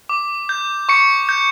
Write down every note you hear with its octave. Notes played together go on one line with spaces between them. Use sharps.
D6
G6
C#6 C#7
G6